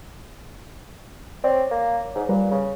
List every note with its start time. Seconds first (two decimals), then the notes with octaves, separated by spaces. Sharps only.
1.44 C4 C#5 D5
1.71 A#3
2.15 G#2
2.29 A#2 G3 B4
2.51 C#3